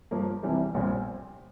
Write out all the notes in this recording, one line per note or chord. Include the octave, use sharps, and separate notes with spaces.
G2 F3 A#3
C2 C3 E3 G3 D4
A#1 A#2 G3 C4